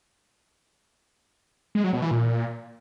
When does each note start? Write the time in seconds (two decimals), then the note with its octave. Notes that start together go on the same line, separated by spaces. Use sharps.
1.75 G#3
1.84 F#3
1.93 B2
2.02 E3
2.11 A#2